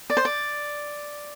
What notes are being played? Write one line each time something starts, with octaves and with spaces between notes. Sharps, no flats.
D5
C5
D5